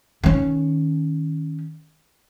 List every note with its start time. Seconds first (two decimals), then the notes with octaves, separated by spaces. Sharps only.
0.24 D#3 C#4